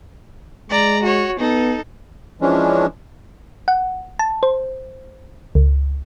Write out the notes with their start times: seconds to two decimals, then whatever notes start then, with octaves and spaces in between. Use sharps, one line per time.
0.70 G#3 D5 A#5
1.03 F#4 C#5
1.39 B3 D#4 A4
2.41 E3 F3 G#3 C#4 D4
3.68 F#5
4.19 A5
4.43 C5
5.55 C#2